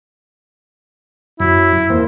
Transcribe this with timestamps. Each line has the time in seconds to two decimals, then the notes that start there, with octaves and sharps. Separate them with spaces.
1.40 F#2 E4
1.90 E2 A#3 C5